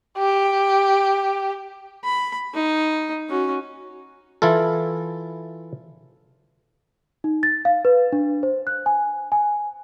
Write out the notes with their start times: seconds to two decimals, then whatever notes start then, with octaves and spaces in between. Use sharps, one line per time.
0.18 G4
2.04 B5
2.54 D#4
3.30 C#4 F#4
4.42 E3 E4 F4 A4
7.24 D#4
7.43 A6
7.65 F5
7.85 B4
8.13 D4
8.43 C5
8.67 F#6
8.86 G#5
9.32 G#5